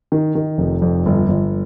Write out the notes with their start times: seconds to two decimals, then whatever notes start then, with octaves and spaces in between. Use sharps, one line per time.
0.12 D#3
0.35 D#3
0.58 F1
0.82 F2
1.06 G1
1.29 G1